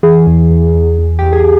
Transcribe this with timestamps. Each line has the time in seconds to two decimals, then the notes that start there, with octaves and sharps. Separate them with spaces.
0.03 E3 G#4
0.27 E2
0.50 E2
0.75 E2
0.99 E2
1.19 E2 G4
1.33 G#4